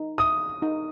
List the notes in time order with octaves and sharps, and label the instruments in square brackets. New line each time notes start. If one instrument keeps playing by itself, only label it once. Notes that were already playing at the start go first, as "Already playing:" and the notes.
Already playing: [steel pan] D#4
[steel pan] E5 [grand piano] D#6
[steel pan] D#4